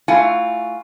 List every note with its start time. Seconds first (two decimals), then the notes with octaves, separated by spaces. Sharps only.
0.08 A3 E4 F4 F#5 G#5